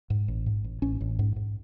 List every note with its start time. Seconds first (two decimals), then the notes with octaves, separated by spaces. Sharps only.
0.10 G#2
0.28 A1
0.46 G#2
0.64 A1
0.82 A1 C#4
1.01 A1
1.19 G#2
1.36 G#2